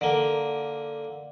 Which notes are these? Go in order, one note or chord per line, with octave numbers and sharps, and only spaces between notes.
D3 A#3